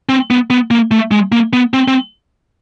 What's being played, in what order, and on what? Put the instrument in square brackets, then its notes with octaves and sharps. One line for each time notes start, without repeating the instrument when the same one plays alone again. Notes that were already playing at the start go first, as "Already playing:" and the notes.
[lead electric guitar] C4
B3
B3
A#3
A3
G#3
A#3
B3
C4
C4